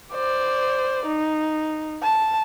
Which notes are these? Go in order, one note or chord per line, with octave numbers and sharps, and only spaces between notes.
C5 D5
D#4
A5